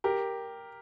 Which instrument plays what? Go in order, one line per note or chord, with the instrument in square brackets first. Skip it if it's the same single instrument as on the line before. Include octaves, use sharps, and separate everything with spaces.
[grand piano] G4 A#4